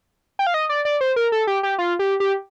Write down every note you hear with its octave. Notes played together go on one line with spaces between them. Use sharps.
G5
F5
D#5
D5
D5
C5
A#4
A4
G4
G4
F4
G4
G4